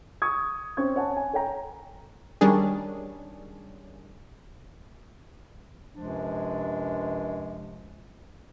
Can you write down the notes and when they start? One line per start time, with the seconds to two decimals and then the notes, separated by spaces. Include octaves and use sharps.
0.22 C#6 D#6 G#6
0.77 C4 C#4 C#6 G#6
0.96 C#5 F#5 G#5 A5
1.17 G#5
1.33 A4 C#5 G5 A#5
2.41 D#3 G3 C#4 D4 G#4
5.95 C#2 F#2 C3 F3 G#3 D4